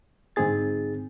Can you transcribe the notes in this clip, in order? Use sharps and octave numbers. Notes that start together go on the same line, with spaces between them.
G#2 D3 C4 D#4 G#4 A6